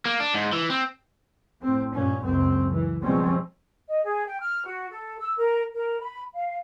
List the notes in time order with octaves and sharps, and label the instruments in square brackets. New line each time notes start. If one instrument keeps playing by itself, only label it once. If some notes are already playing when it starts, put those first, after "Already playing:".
[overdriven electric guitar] A#3
D4
G#2
E3
C4
[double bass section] A2 C4
G2 A#2 C#4
F#1 C#2 F#2 C4
E3
B2 F3 G3 G#3 C4 C#4
[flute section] D#5
G#4
G5
F6
F#4
A4
E6
A#4
A#4
B5
F5